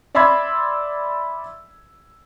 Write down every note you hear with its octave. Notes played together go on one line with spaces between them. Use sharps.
D5 E5 B5 C6 E6 G#6